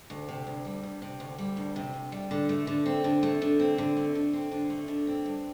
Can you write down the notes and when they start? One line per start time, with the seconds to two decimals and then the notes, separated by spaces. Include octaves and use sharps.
0.10 D2
0.28 C3
0.47 D2
0.65 G3
0.83 D2
1.02 C3
1.20 D2
1.38 G3
1.57 D2
1.76 C3
1.94 D2
2.12 G3
2.31 D3
2.49 A3
2.67 D3
2.86 C4
3.04 D3
3.23 A3
3.42 D3
3.60 C4
3.78 D3
3.97 A3
4.15 D3
4.33 C4
4.51 D3
4.70 A3
4.88 D3
5.07 C4
5.26 G2